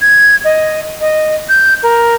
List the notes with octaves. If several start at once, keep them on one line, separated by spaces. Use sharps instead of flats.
G#6
D#5
D#5
G6
A#4